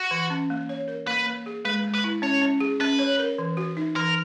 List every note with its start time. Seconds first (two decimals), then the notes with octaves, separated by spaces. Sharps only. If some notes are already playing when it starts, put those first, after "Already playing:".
Already playing: F#4
0.11 E3
0.30 C#4
0.50 A#3
0.69 C#5
0.88 A#4
1.07 A#3 B4
1.26 A#3
1.46 G#4
1.65 G#3 B4
1.84 G#3
1.94 B4
2.04 E4
2.22 C#4 C#5
2.42 C#4
2.60 G#4
2.80 C#4 B4
2.99 C#5
3.19 A#4
3.38 E3
3.57 F#4
3.77 D#4
3.96 E3 A#4